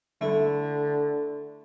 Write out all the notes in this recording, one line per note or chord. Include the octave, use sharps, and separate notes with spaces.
D3 A3 E4